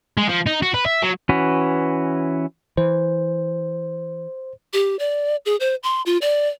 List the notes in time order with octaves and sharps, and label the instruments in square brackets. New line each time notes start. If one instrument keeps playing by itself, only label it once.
[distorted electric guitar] G#3
F3
D#4
F#4
B4
E5
F#3
[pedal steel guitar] E3 C#4 F#4 B4
[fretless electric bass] E3 [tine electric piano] C5
[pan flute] G4
D5
G#4
C5
C6
F4
D5